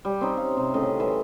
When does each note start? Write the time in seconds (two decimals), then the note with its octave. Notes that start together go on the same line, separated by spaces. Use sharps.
0.05 G3
0.21 C4 C#4 D#4
0.37 F5
0.57 C3
0.74 A2 C#3 D#5
1.00 E3 E5 C6